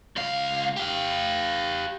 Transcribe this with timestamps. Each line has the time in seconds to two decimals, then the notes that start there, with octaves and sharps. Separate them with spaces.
0.16 C#2 F5
0.77 G4 F5